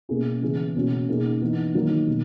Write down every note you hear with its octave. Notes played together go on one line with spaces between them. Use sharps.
B2 A#3 C#4 E4 G#4
C#3 E3 B3 E4 G#4
B2 A#3 C#4 F#4
B2 A#3 D#4 G#4
E3 B3 D#4
D#3 F#3 A#3 D#4
B2